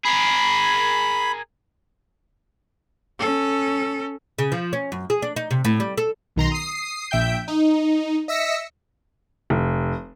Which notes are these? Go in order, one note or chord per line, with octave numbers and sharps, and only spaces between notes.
G#4 A#4 B5
C#4 A4
C#3
F3
C#4
F#2
G#4
D4
D#4
C3
A2
G3
A4
B1 D#3 A#5 C6
D#6 C7
A#1 E5 G5 G6
D#4
D#5 E5 E6 A#6 B6 C#7
F1